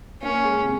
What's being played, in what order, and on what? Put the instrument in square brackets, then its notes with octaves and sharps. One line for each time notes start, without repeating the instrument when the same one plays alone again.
[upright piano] A#3 [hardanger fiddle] C#4
[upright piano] G#3
C3